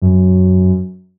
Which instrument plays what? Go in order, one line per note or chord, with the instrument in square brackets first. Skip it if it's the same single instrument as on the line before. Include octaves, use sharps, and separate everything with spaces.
[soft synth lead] F#2